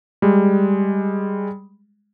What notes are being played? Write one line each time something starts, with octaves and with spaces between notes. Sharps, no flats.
G3 G#3